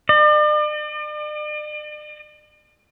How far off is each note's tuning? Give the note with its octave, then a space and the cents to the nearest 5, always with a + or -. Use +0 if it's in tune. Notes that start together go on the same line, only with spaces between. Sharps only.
D5 +45